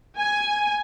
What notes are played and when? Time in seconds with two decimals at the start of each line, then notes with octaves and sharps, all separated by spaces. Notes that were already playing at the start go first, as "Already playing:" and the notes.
0.17 G#5